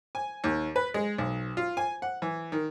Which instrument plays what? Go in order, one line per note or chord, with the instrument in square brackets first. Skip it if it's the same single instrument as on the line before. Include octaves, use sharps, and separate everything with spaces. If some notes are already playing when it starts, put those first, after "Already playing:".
[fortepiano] G#5
D#2
B4
G#3
B1
F4
G#5
F#5
E3
D#3